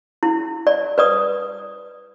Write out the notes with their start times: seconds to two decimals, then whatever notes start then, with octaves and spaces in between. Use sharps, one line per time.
0.23 E4
0.67 D5
0.98 B4 D5 D#6